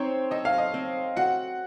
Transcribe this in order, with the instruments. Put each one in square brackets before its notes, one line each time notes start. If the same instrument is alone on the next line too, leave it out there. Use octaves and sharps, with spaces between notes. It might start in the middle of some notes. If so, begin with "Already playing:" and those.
Already playing: [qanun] C4 D#4 [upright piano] C5 C#5
[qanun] A4 [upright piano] D#5
[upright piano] F5
D#5
[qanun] C4
[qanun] F#4 [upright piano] F#5